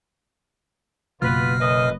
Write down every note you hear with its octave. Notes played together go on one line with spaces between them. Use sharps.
F#1 B2 B3 F4 B4 F6
F#2 B4 D#5